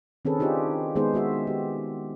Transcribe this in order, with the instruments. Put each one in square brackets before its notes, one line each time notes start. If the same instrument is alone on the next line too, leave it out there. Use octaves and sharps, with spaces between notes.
[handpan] D#3 C4 C#4 G#4 A4 B4
D4 D#4 F4 G4 G#4 C5
D#3 G#3 B3 D#4 G#4 C5
G#3 F#4 E5
G4